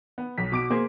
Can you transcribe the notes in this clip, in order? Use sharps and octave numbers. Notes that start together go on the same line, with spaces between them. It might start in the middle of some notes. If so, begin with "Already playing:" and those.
B3
B1 B6
B2 D6 D7
A#3 G#4 C5